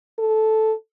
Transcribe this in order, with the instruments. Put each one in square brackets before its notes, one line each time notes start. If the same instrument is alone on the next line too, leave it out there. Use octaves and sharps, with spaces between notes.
[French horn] A4